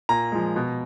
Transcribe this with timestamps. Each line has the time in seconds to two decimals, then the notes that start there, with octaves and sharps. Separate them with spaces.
0.09 A#2 A#5
0.32 F3 G#3
0.56 B2